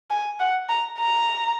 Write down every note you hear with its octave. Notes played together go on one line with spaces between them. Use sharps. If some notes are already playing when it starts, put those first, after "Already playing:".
G#5
F#5
A#5
A#5